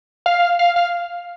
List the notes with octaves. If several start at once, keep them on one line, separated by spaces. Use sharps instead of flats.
F5
F5
F5